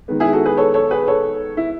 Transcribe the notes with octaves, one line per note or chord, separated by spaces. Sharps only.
D#3 G#3 B3
E4 G#4
F#4 A4
G#4 B4
A4 C#5
A4 C#5
G#4 B4
A4 C#5
E4